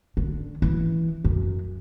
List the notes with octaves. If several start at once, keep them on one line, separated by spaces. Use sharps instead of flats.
D3
E3
F#2